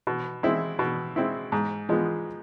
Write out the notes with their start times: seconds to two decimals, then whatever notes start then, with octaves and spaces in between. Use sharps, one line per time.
0.07 B2
0.43 G#3 C4 E4
0.79 B2
1.16 G#3 C4 E4
1.52 G#2
1.89 F3 G#3 B3